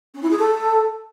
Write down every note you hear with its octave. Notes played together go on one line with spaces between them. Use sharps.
C#4
E4
G#4
A4